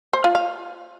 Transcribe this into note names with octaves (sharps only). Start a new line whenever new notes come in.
C5
F4
F5